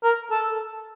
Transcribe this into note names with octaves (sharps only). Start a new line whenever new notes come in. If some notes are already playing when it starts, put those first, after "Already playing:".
A#4
A4